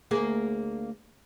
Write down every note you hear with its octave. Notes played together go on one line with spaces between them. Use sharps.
D2 A#3 G#4